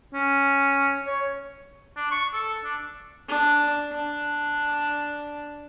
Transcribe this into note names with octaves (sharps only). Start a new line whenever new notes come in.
C#4
C#5
D4
C#6
A4
D4
D4
D4